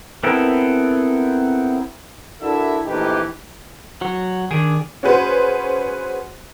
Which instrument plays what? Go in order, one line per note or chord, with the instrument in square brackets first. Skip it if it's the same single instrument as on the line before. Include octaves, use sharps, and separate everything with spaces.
[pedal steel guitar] B3 C4 E4 A4 A#4
[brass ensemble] D4 E4 F#4 A4 A#4 E5
A#1 E3 A3 D#4 G4
[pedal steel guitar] F#3 F#4 C#5
[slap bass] D#3 [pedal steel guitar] D4 G#4
[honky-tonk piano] C#4 F#4 G#4 B4 C5